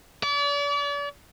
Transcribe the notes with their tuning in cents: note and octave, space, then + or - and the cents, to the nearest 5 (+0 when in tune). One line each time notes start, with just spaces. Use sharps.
D5 -40